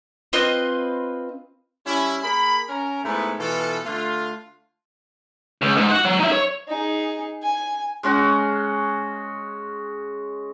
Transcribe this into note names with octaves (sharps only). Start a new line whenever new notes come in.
C4 F4 B4 D#5
G3 C#4 E4
A#3 G#4 B5
C#4 A#4
G#2 A3 B3 E4
B2 E3 F4 A4
D3 A3 F4
C#2
G#2
F#4 F#5
F#3
D#4 E5
C#5
D#4 G#4
G#5
G#3 C#4 F#4